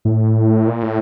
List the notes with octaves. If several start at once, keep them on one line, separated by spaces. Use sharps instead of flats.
A2
A#2
A2